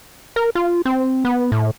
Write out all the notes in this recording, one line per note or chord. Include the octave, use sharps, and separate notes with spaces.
A#4
F4
C4
B3
A2